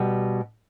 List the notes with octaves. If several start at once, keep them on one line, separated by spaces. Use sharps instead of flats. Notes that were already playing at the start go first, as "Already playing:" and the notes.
Already playing: B2 G3